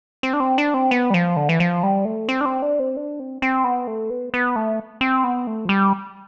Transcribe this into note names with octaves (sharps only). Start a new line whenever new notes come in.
C4
D4
C4
D4
C4
B3
G3
F3
D3
E3
F3
G3
A3
C4
D4
C4
D4
C4
D4
C4
C4
B3
A3
B3
B3
A3
C4
B3
A3
F3
G3